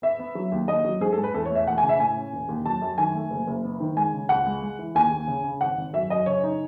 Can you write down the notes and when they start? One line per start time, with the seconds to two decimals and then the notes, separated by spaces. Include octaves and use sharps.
0.02 B3 E5
0.19 B3
0.35 F#3
0.52 D#2
0.68 D#2 D#5
0.85 F#3
1.01 G#2 G#4
1.12 A4
1.17 G#3
1.24 B4
1.34 E2 A4
1.45 C#5
1.50 A3
1.55 E5
1.67 E1 F#5
1.78 G#5
1.83 C#3
1.89 E5
1.99 A2 G#5
2.17 C#4
2.33 E1
2.48 D#2
2.65 F#3 A5
2.82 F#2
2.98 D#3 G#5
3.15 A3
3.30 F#1
3.47 F#1
3.64 B3
3.80 D#3
3.97 G#3 G#5
4.14 C#3
4.29 C#2 F#5
4.46 G#3
4.62 G#3
4.79 E3
4.95 D#2 G#5
5.11 D#2
5.27 C#3
5.44 C#3
5.61 G#1 F#5
5.77 G#1
5.93 F#2 E5
6.10 F#2 D#5
6.26 C#3 C#5
6.44 D#4